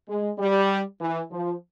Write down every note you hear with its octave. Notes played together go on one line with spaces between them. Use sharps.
G#3
G3
E3
F3